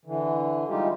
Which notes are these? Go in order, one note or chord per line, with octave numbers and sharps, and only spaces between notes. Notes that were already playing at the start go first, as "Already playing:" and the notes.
D3 E3
G3 G#3 D#4 F4 G4